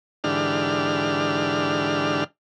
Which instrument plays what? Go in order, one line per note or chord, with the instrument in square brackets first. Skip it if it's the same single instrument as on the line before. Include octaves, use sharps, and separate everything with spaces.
[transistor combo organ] G#2 D3 E3 D4 G4 F6